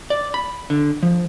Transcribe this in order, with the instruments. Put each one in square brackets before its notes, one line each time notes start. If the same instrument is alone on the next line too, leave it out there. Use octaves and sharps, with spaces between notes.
[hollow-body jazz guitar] D5
B5
D3
F3